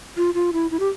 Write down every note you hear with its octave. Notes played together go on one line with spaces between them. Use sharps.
F4
F4
E4
E4
G4